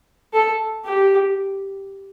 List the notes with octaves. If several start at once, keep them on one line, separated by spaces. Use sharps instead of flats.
A4
G4